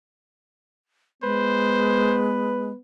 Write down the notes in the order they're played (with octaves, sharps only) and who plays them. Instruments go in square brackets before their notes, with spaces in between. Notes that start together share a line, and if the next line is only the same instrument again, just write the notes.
[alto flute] G#3 [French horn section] B3 [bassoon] B4 [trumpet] C5